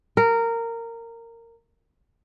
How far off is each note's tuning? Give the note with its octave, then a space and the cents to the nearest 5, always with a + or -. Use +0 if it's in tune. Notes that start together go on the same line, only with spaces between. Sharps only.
A#4 -15